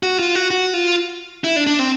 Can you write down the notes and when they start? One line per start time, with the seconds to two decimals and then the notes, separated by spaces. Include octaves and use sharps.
0.03 F#4
0.19 F4
0.35 F#4
0.51 F#4
0.74 F4
1.44 E4
1.56 D4
1.67 D4
1.79 C4